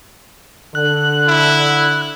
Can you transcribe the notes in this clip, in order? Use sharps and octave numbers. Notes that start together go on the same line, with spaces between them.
D3 F#6
E4